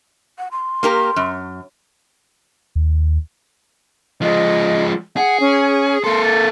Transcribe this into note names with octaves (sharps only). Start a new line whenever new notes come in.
F#5
C6
A#3 G4 A#4
F#2
D#2
F3 G#3 D#5
G#4 F#5
C#4
A#3 A4 C6
A6